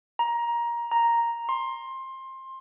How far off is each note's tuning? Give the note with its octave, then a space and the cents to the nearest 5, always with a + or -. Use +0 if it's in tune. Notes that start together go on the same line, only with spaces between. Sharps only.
A#5 +15
A#5 +0
C6 +20